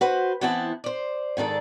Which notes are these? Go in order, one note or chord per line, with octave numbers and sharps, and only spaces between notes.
F#4 B4 C5
E3 B3 C4 E4 F#5 A5
C5 D5
G#2 D#3 D4 A4